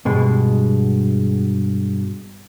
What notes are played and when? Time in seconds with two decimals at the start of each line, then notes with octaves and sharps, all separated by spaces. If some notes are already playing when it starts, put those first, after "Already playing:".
0.05 G2 B2 G#3